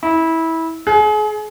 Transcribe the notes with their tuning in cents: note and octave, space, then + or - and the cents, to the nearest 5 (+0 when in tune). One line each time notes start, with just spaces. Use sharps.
E4 -20
G#4 +35